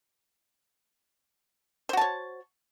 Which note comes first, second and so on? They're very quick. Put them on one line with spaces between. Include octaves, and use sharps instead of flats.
C5 F#4 A5 C#5